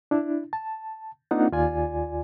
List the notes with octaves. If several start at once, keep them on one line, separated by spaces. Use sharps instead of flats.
D4 E4
A5
A#3 C4 D4 D#4 F4 F#5
D#2 F4 D5 G#5